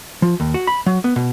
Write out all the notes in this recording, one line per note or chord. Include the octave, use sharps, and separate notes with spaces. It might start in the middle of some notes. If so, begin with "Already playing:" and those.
F3
D#2
F#4
B5
F#3
B3
B2